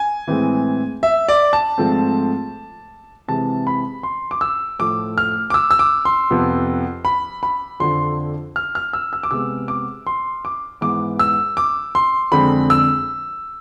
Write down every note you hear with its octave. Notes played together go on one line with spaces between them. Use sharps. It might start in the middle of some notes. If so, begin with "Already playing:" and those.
Already playing: G#5
A2 E3 G#3 C4
E5
D5
A5
G#2 F3 A3 C4
C3 E3 G#3 C4 A5
B5
C6
D6
E6
A2 F3 A3 D6
F6
D6
E6
E6
D6
C6
F2 C3 F3 B3
B5
B5
F2 D3 F3 C6
F6
F6
E6
E6
D6
C3 G#3 B3 E6
D6
C6
D6
G#2 E3 B3 D6
E6
D6
C6
F2 D3 G#3 C4 B5
E6